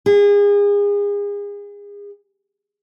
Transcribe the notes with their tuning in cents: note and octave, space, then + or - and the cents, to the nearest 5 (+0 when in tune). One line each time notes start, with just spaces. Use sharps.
G#4 -35